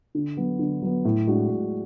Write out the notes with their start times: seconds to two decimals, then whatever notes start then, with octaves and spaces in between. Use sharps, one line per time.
0.15 D3
0.37 F#3 B3
0.59 D3
0.82 F#3 B3
1.05 A2
1.27 G#3 D4 F#4
1.49 A2